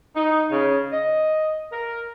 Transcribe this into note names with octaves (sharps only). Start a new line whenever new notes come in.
D#4
C#3
D#5
A#4